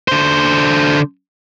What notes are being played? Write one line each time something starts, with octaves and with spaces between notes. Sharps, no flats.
D3 C5